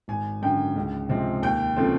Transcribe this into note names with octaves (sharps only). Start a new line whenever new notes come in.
G#1 G#5
F#2 D3 G5
C#2
C3 F3 G#3 C4
D#2 G5
C#3 F3 A3 C4